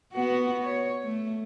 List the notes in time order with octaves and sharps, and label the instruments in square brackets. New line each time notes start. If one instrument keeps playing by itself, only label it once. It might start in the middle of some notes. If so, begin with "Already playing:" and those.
[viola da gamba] B3 F#4
C#5
A3